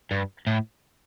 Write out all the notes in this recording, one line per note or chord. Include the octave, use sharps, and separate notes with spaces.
G2
A2